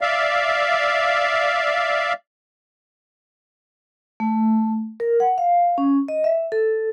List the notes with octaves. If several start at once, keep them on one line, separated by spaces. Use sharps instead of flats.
D5 E5 F5
A3
A#4
F#5
F5
C#4
D#5
E5
A4